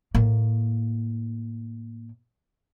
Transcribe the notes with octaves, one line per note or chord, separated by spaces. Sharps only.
A2 A#3